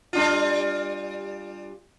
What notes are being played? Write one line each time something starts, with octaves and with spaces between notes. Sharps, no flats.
G3 D4 F4